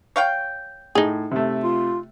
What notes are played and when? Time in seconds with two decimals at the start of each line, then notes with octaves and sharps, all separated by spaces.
0.16 C#5 F5 G5
0.95 A2 D#4 G#4
1.31 C3 A3
1.64 F4